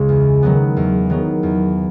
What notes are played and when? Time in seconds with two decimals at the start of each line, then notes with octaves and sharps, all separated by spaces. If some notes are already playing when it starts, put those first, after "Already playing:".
Already playing: C#2 C#3 G#3
0.09 E2
0.43 D#3 F#3 B3
0.76 E2
1.10 D#3 F#3 B3
1.43 E2